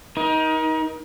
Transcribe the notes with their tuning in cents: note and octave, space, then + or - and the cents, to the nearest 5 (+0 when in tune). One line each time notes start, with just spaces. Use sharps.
D#4 +20 A#4 +35